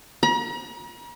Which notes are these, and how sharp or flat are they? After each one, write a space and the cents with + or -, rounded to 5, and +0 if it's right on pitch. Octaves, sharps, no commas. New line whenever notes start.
A#5 +45